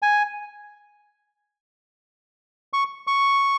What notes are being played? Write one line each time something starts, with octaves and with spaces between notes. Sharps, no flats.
G#5
C#6
C#6